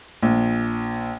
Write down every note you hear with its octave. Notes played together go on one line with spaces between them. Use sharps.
A#1